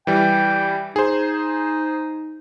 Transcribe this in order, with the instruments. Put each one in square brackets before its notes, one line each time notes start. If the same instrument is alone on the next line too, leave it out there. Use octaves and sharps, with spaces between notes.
[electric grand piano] E3 G3 [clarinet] G5
[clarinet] D#4 [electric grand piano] G#4 C5